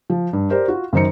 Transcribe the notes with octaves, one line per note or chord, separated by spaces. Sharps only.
F3
G2
G4 A#4 C5 D5
F4 F#4
F#2 D#3 C5 A#5 C#7